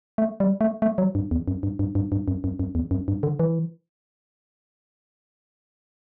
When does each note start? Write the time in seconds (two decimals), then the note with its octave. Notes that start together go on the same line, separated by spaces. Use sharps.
0.18 A3
0.40 G3
0.61 A3
0.82 A3
0.98 F#3
1.15 G2
1.31 E2
1.48 F#2
1.63 G2
1.79 G2
1.95 G2
2.12 G2
2.28 F#2
2.44 F#2
2.59 F#2
2.75 E2
2.91 F#2
3.08 G2
3.23 D3
3.40 E3